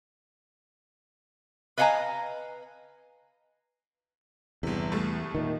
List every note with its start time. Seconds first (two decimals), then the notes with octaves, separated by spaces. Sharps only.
1.78 B4 D#5 F5 F#5 G#5 A#5
4.63 G1 E2 C3
4.92 C2 A3
5.35 A#2 D#3